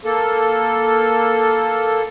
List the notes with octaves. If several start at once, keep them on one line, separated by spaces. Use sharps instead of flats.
A#3 A4